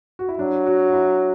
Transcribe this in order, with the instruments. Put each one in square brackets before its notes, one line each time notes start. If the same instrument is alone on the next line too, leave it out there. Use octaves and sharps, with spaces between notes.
[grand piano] F#4
E4
[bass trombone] F#3 [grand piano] D4
[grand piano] F#4
F#4
E4